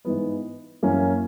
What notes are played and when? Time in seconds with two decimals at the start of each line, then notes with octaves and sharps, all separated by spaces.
0.05 G#2 E3 B3
0.83 F#2 E3 A#3 C#4